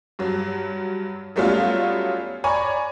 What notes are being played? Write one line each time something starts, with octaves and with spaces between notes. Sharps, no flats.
G2 F#3
F#3 G3 A3 B3 C#4 F4
C#5 D5 G#5 A#5 B5 C#6